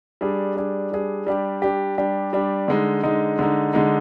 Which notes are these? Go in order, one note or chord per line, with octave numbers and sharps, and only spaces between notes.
G3 D4 G#4
G3 D4 G#4
G3 D4 G#4
G3 D4 G4
G3 D4 G4
G3 D4 G4
G3 D4 G4
D3 G#3 D#4
D3 G#3 D#4
D3 G#3 D#4
D3 G#3 D#4